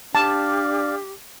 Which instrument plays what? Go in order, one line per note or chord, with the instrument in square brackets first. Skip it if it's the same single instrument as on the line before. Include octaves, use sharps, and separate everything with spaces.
[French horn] D4 [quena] G4 [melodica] D5 F5 [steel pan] A5